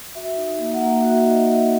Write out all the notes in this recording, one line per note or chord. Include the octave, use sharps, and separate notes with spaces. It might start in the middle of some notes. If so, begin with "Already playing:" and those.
F#4 E5
D#4
A#3
E5
F#5
A#3
F#4 E5
E5
D#4 D#5
A#3 E5